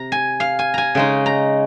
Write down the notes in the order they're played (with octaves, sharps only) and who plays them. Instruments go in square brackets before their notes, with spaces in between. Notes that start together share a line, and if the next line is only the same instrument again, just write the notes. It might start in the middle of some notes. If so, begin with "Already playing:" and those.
Already playing: [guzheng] C3 A#5
G#5
F5
G#5
G#5 A#5
C#3 G#3 D#4
A#5